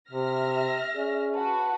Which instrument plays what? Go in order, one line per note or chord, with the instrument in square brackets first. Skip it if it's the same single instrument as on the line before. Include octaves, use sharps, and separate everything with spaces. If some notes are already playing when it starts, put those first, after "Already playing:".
[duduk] C3 [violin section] E5 F6 A#6
[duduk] C#4 [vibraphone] G#4 D5
[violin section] F#4 B4 [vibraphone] A5